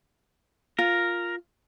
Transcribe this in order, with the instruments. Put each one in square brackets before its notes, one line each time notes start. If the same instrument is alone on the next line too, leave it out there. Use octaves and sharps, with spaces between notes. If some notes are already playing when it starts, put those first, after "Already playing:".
[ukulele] F4 [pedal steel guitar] A#4